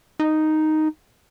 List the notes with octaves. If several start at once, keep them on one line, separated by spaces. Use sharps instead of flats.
D#4